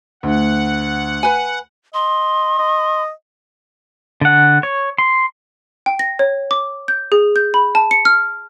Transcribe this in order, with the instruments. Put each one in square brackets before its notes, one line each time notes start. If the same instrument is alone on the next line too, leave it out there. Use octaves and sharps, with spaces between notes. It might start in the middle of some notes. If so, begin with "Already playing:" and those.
[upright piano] D2 [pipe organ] F#5
[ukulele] B4 G#5
[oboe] D#5 [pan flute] C6
[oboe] D#5
[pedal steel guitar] D3 F#5
C#5
C6
[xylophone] G5
A#6
C#5
D6
G6
G#4
G6
B5
A5
C#7
F6